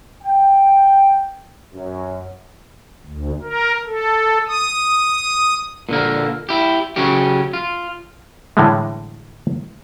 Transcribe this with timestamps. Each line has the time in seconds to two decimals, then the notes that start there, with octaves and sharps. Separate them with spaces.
0.23 G5
1.73 F#2
3.06 D2
3.43 A#4
3.87 A4
4.47 D#6
5.89 A#2 D3 A#3
6.49 E4 G4
6.96 C#3 F#3 C#4 G4
7.53 F4
8.57 A2 D3 E3 G3 G#3